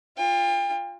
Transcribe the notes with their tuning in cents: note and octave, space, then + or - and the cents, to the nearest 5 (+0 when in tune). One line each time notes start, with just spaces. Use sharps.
F4 +5 G5 +40